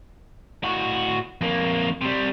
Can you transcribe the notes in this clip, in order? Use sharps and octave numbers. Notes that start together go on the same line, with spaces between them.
A2 F#4
F2 A#3
C3 G3